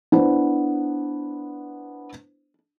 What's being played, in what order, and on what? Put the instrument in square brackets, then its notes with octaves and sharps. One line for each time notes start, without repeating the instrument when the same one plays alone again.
[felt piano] B3 D4 E4 C5